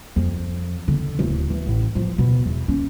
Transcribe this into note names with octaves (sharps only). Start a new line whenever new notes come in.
F2
D3
D1
E3
A1
F3
B2
E2
C#4